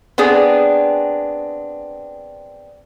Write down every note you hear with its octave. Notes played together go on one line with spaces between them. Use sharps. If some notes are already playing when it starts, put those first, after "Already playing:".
B3 C4 D4 G#4